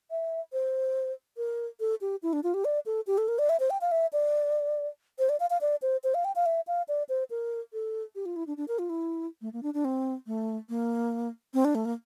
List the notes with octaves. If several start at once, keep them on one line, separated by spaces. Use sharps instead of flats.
E5
C5
A#4
A4
G4
E4
D4
F4
G4
D5
A4
G4
A4
A#4
D5
E5
C5
G5
F5
E5
D5
C5
D5
F5
F5
D5
C5
C5
F5
G5
F5
E5
F5
D5
C5
A#4
A4
G4
F4
E4
D4
D4
A#4
F4
E4
A3
A#3
D4
D4
C4
A3
A#3
C4
D4
A3
A#3